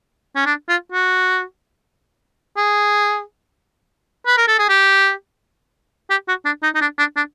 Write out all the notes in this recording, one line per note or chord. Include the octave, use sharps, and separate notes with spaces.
C#4
D4
F4
F#4
G#4
B4
A#4
A4
G#4
G4
G4
F#4
D4
D#4
D#4
D4
D4
D4